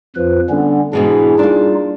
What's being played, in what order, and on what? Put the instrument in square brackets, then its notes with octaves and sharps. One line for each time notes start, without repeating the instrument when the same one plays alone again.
[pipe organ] F2 B4 [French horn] F3
[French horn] D3 [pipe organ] G3 B3 C#4
[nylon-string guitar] G#2 B2 E3 [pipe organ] D4 [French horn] G#4
[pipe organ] G3 D#4 F4 [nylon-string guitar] A#3 D4